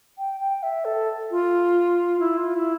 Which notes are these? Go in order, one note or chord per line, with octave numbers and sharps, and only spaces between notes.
G5
G5
E5
A4
F4
E4
F4
E4